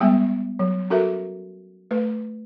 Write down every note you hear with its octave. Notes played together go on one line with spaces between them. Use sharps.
G3 G#3 B3 G5
F#3
C#4 F#4 A4 A#4 E5
A3 B4